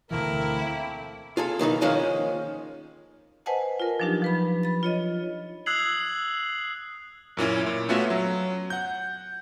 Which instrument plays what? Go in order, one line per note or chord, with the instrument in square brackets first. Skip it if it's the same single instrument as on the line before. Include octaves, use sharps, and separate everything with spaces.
[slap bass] D2 B2 E3 [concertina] A3 A#3 C4 [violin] E4 [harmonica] A#4
[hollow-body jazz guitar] F4 G#4 A4
B1 D#3 E3 D#4
D#3 F3 G#3 A#3 C#4
[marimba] B4 C5 D#5 F#5 G#5 A5
F4 A#4
F3 F#3 D4 D#4 G4
F3 B4 B5
B5 A6
F4 C#5 D#5
[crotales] D#6 E6 F#6 G#6 C7 F#7
[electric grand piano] F#2 A#2 C#4 E4
A#2
A3 B3 C#4 F4 F#4 E5
F#3
F#5 G6